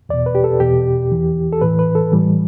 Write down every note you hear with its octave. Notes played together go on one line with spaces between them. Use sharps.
E2 B2 D5
B4
G4
A4
E2 B2 G4
E2 E3
A4
A2 E3 B4
B4
A4
A2 E3 G3